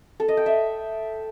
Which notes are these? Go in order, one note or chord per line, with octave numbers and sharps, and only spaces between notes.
A4
D#5
G5
E5